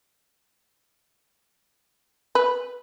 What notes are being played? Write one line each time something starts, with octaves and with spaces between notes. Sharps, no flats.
B4